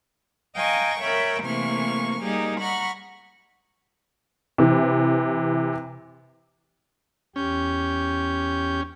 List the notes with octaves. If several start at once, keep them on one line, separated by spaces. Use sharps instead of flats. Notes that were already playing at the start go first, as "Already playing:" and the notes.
D#5 F5 G5 G#5 A#5 C#6
A#4 C#5 E5 G5 B5
C3 E3 A3 A#3 C#6 F6
G3 A#3 D#4 G4 G#4
F#5 A#5 B5 C#6 F6
C3 E3
E2 C#4 G4 G6